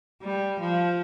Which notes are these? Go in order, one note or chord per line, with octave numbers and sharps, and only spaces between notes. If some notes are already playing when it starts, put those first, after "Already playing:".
G3
F3